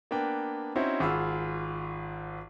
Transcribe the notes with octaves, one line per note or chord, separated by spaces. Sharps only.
A#3 B3 D4 B4 G5
C4 C#4 D#4 E4 F#4 C5
G#1 F4 G#4 F#5 B5 E6